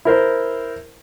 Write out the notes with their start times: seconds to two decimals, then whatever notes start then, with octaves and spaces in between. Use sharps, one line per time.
0.05 E4 A#4 C5